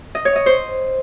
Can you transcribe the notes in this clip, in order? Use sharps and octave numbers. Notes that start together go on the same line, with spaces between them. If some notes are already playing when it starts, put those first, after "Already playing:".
D#5
C#5
D#5
C5